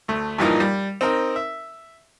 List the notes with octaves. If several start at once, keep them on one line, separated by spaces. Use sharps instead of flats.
D2 A3
G2 A#2 E3 F3 D#4 A#4
G3
C4 D#4 A#4
E5